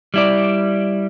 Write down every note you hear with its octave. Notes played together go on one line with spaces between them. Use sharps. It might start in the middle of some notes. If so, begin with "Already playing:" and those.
G3 E4 D5